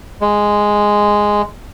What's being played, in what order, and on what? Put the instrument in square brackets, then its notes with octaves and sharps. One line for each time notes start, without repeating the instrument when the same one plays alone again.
[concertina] G#3